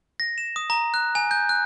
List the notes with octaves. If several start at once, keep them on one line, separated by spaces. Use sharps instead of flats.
A#6
E7
D#6
A#5
F#6
G#5
G6
F#6